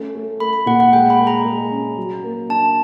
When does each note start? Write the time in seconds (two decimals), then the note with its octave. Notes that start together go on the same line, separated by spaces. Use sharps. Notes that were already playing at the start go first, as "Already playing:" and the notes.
Already playing: A3 C#4
0.15 A3
0.40 A3 B5
0.53 B5
0.66 A#2 F#5
0.80 F#5
0.93 G#3 G5
1.10 B5
1.20 G#3
1.27 A#5
1.45 G#3
1.72 C#4
1.97 F#3
2.24 A#3
2.49 D4 A5